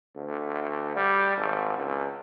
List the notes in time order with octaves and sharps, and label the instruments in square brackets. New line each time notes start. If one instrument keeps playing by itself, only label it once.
[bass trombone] D2
G3
G#1
C#2